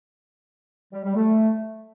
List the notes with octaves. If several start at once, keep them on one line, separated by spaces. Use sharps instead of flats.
G3
G3
A3